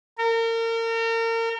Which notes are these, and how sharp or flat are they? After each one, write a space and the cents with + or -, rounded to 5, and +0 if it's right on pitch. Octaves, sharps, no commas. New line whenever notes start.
A#4 -35